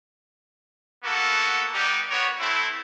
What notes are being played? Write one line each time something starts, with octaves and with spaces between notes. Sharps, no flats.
A#3 B3 F#4 A4
G3 B3 D#4 G4
B3 F#4 A#4 C#5
A3 C4 E4